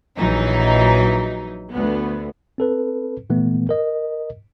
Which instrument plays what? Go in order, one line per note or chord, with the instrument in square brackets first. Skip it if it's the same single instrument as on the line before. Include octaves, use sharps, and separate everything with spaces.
[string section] A#1 E3 F#3 D#4
D2 B3
[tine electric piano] C4 A4 B4
A#2 E3 A3 B3
A#4 D#5